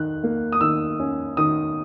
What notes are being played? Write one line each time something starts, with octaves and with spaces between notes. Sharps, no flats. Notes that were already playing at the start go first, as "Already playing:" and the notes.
Already playing: D#3 F#6
A#3
D#6
D#3 E6
C#4
D#3 D#6